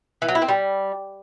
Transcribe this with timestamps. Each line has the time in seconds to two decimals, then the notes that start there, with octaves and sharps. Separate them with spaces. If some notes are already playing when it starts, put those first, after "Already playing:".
0.22 E3
0.28 F#3
0.35 E4
0.42 C4
0.48 G3